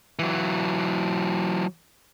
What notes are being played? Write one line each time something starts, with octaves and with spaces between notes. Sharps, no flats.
E3 F#3